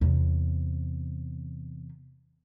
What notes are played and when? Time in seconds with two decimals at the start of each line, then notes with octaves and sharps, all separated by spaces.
0.01 E2 C3